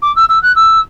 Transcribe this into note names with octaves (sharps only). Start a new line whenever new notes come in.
D6
E6
E6
F#6
E6